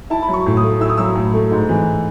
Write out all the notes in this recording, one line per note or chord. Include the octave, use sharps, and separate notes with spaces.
E4 A5
B5
F#3
C#6
A2
D#6
A3
E4 E6
D#6
F#3 E6
A2
A3
G#2
E3